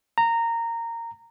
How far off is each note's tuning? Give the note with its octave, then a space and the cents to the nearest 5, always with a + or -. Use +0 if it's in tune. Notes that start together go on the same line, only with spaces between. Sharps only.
A#5 -15